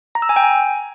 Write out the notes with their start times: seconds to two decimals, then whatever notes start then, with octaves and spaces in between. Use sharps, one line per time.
0.15 A#5
0.22 E6
0.29 G#5
0.36 G5
0.43 G#5